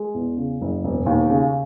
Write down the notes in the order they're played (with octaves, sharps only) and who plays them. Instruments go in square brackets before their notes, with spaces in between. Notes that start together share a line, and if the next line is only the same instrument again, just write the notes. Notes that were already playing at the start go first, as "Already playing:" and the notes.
Already playing: [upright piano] G#3
E2
C#3
F#1
E1
D#2
C#3